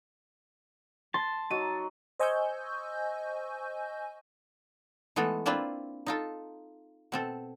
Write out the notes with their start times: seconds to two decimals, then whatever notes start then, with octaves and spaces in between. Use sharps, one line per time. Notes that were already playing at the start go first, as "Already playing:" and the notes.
1.14 A5 C6
1.50 F#3 D#4 F#4 D#7
2.20 C5 D#5 G#5 C#6 E6 G6
5.16 E3 G#3 A3 B3 A4
5.46 A#3 C4 D4 E4 F4 B4
6.06 D#4 F4 A4
7.12 B2 C4 A4